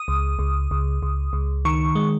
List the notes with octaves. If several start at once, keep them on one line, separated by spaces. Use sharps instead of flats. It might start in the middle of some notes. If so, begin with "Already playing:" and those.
Already playing: D#6
C#2
C#2
C#2
C#2
C#2
D#3 C#6
G#3